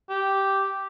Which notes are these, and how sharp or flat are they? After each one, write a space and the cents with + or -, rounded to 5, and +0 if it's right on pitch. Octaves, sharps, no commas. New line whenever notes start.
G4 -5